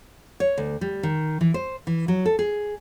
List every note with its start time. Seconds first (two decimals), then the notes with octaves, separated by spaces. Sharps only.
0.40 C#5
0.58 D2
0.81 G3
1.03 D#3
1.41 E3
1.54 C5
1.87 E3
2.08 F#3
2.26 A4
2.39 G#4